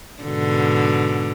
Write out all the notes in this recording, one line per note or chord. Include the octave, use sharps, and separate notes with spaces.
G#2 B2 D3